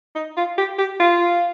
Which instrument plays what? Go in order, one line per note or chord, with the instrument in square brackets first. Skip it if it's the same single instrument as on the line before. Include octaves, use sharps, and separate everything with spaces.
[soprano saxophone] D#4
F4
G4
G4
F4